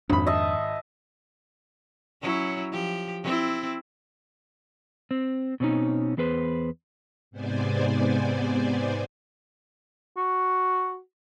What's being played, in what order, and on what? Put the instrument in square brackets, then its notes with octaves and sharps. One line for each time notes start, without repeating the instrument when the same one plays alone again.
[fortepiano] G#1 B5 [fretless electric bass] F2 D4
[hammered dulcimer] D#5 E5 A5
[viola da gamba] F#3 C#4 E4
F3 G4
C4 E4
[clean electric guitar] C4
B2 C4 C#4 D#4
E2 B3 G#4 B4 C5
[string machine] G#2 C3 B3 C5 D5 G#5
[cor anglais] F#4